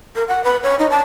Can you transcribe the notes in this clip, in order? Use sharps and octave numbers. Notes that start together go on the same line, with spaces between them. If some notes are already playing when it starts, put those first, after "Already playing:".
A#4
F#5
B4
C#5
D#4
A5